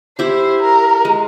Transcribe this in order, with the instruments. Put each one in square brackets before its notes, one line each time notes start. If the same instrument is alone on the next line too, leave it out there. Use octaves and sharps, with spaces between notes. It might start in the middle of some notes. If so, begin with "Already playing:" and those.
[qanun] E4 G4 [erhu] C5
[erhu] A#4
[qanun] G#3